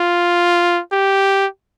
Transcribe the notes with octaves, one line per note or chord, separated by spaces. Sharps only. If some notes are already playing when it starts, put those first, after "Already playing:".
Already playing: F4
G4